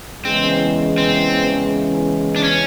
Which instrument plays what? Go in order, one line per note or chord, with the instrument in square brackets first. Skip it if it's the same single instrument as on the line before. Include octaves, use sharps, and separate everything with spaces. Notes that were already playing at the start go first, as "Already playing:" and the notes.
[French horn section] E2 C#3 E3 G#3 [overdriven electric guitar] C4
[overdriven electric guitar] C4
D4
C#4